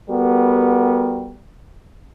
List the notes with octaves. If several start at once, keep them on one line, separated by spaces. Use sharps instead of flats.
G3 B3 F#4 G4 A4 A#4